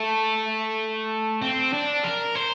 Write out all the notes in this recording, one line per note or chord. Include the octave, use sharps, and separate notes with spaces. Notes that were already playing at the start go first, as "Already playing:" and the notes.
Already playing: A3
C4
D4
A#4
C5